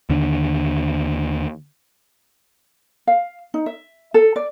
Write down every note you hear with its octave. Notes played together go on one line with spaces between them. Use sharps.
D#2 D3
F5
D#4
E5
A4
D5